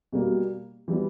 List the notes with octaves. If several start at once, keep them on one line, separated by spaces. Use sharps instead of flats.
B2 G3 A#3
E3 G3 B3 E4